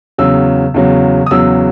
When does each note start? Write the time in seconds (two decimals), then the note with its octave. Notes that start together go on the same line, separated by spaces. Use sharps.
0.18 E2 C#3 F#3 E6
0.74 E2 C#3 F#3
1.26 D#6
1.31 E2 C#3 F#3 E6